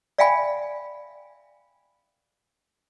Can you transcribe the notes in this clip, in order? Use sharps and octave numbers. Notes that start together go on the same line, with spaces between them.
D5 E5 F5 G5 G#5 B5